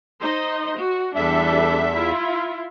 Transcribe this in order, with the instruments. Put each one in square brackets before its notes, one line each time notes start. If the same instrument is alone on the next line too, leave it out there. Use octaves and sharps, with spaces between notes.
[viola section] D#4 C5 D#5
F#4
[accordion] E2 E5 [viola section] G3 D4 A4
[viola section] E4 F4